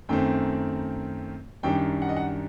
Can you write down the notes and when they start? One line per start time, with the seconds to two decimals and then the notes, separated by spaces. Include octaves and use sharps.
0.09 F#2 D#3 A3 C4 G5
1.63 F#2 D#3 G3 D4 G5
2.02 F#5
2.09 D#5
2.17 F#5